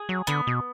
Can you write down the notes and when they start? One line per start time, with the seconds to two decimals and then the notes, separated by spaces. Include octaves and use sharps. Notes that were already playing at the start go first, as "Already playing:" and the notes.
Already playing: G#4
0.09 F#3
0.27 D3 B3
0.47 B2